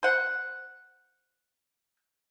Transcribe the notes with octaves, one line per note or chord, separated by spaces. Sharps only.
C5 F#5